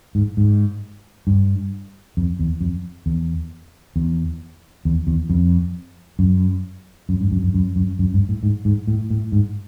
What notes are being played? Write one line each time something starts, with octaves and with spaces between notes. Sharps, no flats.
G#2
G#2
G2
F2
E2
F2
E2
E2
E2
E2
F2
F#2
F#2
G2
F#2
F#2
F#2
F#2
F#2
G2
A2
G#2
G#2
A2
A2
G#2